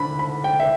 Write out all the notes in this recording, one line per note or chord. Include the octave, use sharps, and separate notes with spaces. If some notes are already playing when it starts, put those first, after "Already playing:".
Already playing: D3 B5
B5
G5
E5